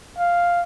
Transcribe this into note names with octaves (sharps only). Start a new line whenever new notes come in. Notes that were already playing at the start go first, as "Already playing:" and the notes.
F5